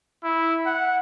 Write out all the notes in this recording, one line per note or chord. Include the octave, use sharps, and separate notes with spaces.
E4
F#5